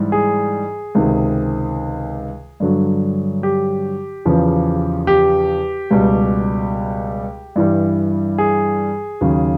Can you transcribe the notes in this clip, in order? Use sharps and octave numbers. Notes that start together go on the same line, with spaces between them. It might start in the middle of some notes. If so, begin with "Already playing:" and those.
Already playing: G#2 E3 G3
G#4
C#2 C3 D#3
G2 D3 F#3
G4
E2 C#3 F3
G4
C#2 B2 G3
G2 E3 G3
G#4
D#2 C#3 F#3